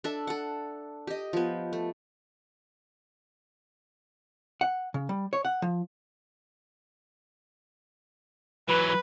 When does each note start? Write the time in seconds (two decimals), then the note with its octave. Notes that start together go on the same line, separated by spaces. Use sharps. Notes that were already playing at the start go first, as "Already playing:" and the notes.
0.04 D4 A4 E5
0.27 A4 F#5
1.07 G4 D#5
1.33 F3 B3
1.73 A3
4.61 F#5
4.94 C#3
5.09 G3
5.33 C#5
5.45 F#5
5.62 F3
8.69 E3 F#3 B4